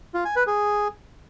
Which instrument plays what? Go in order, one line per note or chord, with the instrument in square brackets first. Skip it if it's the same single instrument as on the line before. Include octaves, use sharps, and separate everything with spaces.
[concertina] F4
G#5
B4
G#4